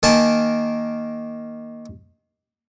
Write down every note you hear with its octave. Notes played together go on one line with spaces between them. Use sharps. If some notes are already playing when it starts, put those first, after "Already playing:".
D#3 A#3 G#5 A5